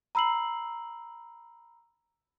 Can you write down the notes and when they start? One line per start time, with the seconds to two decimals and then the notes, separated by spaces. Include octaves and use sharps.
0.15 A#5 B5 E6 C7 F#7